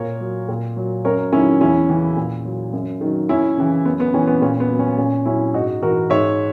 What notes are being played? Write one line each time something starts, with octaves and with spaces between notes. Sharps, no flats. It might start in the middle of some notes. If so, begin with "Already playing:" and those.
Already playing: A#2 A#4 C#5
F#3
A#2
F#3
F#2 A#4 C#5
D#3 F#3 C#4 E4
E2 C#4 E4
C#3 E3
A#2
F#3
F#2
D#3 F#3
F#2 C#4 E4
C#3 E3
F#2 B3
B3
E3 C#4
B3
A#2 C#4
B3
F#3
C#4
A#2 C#4
F#3 C#4 E4
G#2 D#4 F#4
E3 F#4 A#4
G#2 C#5 E5